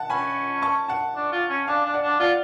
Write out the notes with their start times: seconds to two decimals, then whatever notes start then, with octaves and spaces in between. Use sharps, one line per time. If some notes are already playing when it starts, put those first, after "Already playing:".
Already playing: F#5 A5
0.10 C#4 G#5 B5
0.62 A5 C#6
0.88 F#5 A5
1.15 D4
1.32 F4
1.50 C#4
1.67 D4 F5 G#5
1.85 D4
1.94 D5 F#5
2.03 D4
2.20 F4 D5 F#5